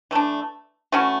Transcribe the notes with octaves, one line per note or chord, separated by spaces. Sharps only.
E3 A3 D4
E3 A3 C#4 F#4